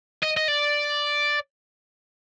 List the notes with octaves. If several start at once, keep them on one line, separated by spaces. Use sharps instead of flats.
D#5
D#5
D5